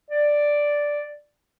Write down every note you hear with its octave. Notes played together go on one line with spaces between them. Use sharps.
D5